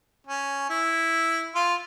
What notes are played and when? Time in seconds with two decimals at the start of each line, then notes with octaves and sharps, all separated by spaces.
0.26 C#4
0.70 E4
1.55 F4